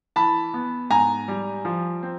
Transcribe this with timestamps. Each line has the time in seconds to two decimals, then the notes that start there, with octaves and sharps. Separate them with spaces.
0.16 E3 A5 B5
0.54 B3
0.91 G#2 G#5 A#5
1.28 G3
1.65 F3
2.03 C4